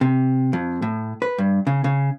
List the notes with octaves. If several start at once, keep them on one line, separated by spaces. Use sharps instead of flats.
C3
F2
A2
B4
G2
C#3
C#3